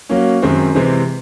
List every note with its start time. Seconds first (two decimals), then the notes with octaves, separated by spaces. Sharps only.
0.09 F#3 A#3 C#4
0.42 F#2 D#3 G#3 C4
0.75 C3 E3 G#3 C4